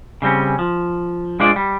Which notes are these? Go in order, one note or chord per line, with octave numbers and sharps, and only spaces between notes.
C#3 G3 C4 C#4
F3
G#3 D4 F4 C5 D5
G3